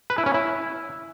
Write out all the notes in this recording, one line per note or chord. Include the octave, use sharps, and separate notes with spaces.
B4
E4
C#4
E4